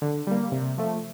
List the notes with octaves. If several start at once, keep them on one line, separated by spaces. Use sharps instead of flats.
D3
G3 A#3
C3
F3 A3